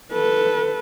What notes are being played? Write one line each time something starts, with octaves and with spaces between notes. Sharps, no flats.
A4 B4